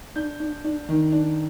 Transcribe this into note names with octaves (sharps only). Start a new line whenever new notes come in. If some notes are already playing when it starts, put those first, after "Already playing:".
D4 G6
D4
D4
D#3
D4